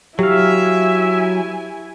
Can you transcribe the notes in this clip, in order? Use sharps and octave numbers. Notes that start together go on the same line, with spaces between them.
F#3 E4 G4 E5 F5 G#5